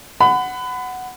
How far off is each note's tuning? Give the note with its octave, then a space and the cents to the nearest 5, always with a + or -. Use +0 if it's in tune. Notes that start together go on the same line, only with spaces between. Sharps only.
F#5 +0 B5 +30